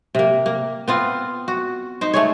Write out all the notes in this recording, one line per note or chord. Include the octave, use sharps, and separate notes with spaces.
C3 A#3
A#3
B3 C4 F4
F#4
D#4 C5
A3 G#4 C#5